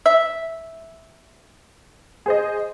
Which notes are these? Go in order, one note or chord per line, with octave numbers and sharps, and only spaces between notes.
E5
G#4 C5 D#5